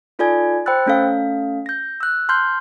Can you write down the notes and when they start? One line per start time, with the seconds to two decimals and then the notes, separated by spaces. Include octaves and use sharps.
0.19 D#4 F4 A4 D5 G#5 G#6
0.66 C5 G5 B5 E6 F#6 A6
0.86 A3 C#4 A4 F5
1.66 G6 A#6
2.00 E6 F#6
2.29 A5 C6 F6 G6